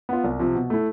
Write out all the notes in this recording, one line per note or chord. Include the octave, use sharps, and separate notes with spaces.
B3 F4
C2
C3 F3
B2
A3 E4